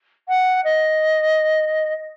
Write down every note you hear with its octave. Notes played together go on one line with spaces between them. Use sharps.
F#5
D#5